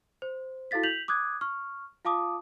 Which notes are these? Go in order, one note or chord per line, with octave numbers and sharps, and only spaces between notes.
C5
E4 F#4 A4 F5 A6 B6
G6 B6 F7 F#7
D6 D#6 F#6 G#6
C#6 F6
F4 F5 A5 D6 D#6